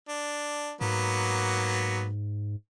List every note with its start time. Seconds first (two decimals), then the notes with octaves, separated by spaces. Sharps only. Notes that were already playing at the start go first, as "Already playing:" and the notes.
0.09 D4
0.81 G#2 F#3 A#3 B3